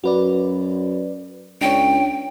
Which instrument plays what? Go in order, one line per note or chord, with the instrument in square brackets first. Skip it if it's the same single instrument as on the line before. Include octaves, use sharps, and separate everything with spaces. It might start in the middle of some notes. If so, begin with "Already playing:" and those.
[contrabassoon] F#2 [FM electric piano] F#4 B4 D5
[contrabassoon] C#2 [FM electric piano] D4 C#5 [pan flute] G5